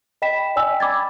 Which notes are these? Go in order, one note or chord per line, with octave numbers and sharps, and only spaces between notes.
D#5 G5 B5 B6 E7
D5 D#5 G5 G#5 E6
B5 D6 G#6 A6